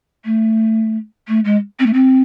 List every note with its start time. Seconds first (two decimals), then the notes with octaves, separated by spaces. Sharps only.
0.24 A3
1.27 A3
1.44 G#3
1.79 C4
1.86 A3
1.93 C4